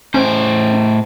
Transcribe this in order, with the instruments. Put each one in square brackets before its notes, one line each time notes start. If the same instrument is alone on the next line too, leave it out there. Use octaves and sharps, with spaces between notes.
[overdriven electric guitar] A2 C5 [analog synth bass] C#4